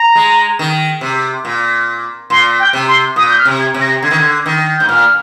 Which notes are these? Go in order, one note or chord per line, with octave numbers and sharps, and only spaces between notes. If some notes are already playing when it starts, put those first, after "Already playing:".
Already playing: A#5
G#3
D#3
C3
A#2
A#2 C6
G5
C3
C6
A#2 D#6
G6
F6
C3
G#6
C3
A#6
D3 G#6
D#3
D3
D#3
G#2 G6
A#2 F6